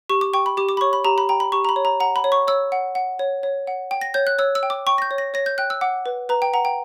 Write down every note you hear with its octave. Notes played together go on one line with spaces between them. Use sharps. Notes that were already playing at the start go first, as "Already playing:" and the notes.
G4 C#6
D6
G5 C#6
B5
G4 D6
D6
B5
C#5 C#6
B5
G4 A#5
B5
G5 A#5
B5
G4 C#6
A#5
B5
C#5
A#5
F#5 A#5
B5
C#5
C#6
C#5 E6
F#5
F#5
C#5
C#5
F#5
G5
A#6
C#5 G6
F#6
C#5 E6
E6
G5
D6
G5 C#6
A#6
G6
C#5
A#6
C#5 A#6
G6
G5 F#6
E6
F#5 D6
B4
B4 A#5
G5
F#5 A#5
G5